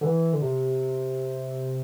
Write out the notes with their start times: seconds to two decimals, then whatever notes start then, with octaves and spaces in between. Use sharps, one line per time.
0.01 D3
0.05 E3
0.33 D3
0.42 C3